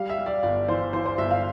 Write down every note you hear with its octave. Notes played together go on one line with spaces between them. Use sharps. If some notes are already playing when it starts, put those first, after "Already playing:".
Already playing: G3 F5
E5
G3
D5
G1 D5
E3 C5
E3 C5
C5
G1 E5
F5